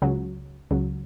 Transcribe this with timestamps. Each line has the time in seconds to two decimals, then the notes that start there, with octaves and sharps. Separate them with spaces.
0.02 C#2 C#3 F#3
0.71 C#2 C#3 F#3